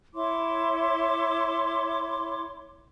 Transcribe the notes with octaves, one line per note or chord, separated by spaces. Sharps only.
E4 C#5 C6 D6